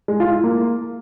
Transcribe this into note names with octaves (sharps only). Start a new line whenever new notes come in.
G#3
F4
E4
A#3